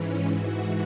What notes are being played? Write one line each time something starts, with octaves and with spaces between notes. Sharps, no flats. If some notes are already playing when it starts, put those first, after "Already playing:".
Already playing: G#2 E3 C#4
F#4